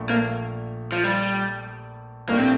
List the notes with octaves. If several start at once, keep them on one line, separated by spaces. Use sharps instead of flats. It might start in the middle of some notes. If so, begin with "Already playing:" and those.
Already playing: A#1 A#2 A3
A#3
F3
G3
A#1 A2 A3 A#3 D4 G4
C4